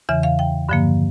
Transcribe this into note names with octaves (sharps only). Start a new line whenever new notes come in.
E2 C#3 E3 E5
F5
G5
G2 D3 F3 A#3